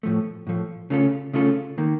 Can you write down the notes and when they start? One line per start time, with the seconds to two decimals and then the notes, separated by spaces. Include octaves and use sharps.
0.03 A2 F3 A3
0.47 A2 F3 A3
0.90 C#3 A3 C#4 F4 A4
1.33 C#3 A3 C#4 F4 A4
1.78 D#3 A#3